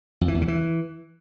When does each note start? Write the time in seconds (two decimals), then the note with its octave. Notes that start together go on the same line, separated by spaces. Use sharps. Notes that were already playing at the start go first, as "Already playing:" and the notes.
0.21 F2
0.28 E3
0.35 E2
0.41 C#3
0.48 E3